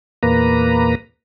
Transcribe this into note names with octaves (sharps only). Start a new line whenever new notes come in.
E2 A#2 A#3 B4 A#5